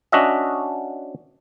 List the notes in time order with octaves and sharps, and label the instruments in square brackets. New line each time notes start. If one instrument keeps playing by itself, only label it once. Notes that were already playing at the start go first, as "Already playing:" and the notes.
[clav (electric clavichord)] C#4 D4 F#4 D#5 E5